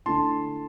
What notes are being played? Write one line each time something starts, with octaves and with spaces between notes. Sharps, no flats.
D3 A3 E4 A5 C6